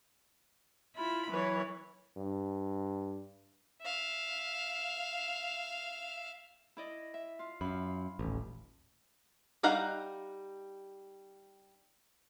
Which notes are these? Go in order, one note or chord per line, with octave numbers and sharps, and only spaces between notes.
E4 F4 B5
E3 F#3 B4 C#5
G2
E5 F5
E4 D5 D#5
E5
F4
F#2 F5 B5
D#1 A1
G3 D#4 F5 F#5 A#5